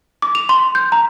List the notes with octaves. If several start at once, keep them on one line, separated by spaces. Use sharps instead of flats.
D6
F7
C6
G6
A#5